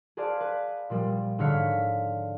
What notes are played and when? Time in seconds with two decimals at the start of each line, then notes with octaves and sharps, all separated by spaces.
0.17 G#4 B4 C5 D5 F5 A5
0.40 B4
0.90 A#2 F3 G3
1.38 G#2 D3 C#5 F5 B6 C#7